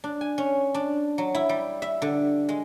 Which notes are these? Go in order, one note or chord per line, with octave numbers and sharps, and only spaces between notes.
D4
G#5
C#4
D4
F#3
E4
G3
E5
D3
G#3